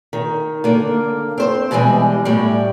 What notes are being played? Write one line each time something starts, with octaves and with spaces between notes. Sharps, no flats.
D#3
D3 A#3
C4 C5
B2 D3 E3 G3 G#3
A2 G3